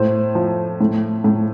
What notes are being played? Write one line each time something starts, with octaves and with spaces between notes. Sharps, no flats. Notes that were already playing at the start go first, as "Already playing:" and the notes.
Already playing: A2 C5
F3
A2
A2